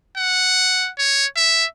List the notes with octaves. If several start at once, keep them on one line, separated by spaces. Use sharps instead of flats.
F#5
C#5
E5